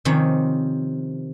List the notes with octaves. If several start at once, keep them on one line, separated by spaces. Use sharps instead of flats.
C3 D#3 F3 C#4 C#5